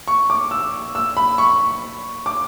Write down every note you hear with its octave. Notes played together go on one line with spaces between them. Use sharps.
C#6
D6
E6
E6
B5
C#6
D6